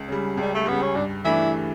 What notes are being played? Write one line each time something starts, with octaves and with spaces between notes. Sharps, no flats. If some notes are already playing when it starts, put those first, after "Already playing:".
Already playing: C#2
C#3 G3
C#2 G3
A3
C#3 G3 B3
C#4
G2 D4
E3 A3 D4 E4